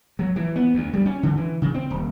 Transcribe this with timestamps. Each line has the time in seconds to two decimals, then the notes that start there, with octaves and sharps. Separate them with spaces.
0.19 F#3
0.36 E3
0.56 B3
0.74 D2
0.94 G3
1.06 C#4
1.23 D3
1.37 E3
1.62 C#3
1.74 C4
1.90 D#1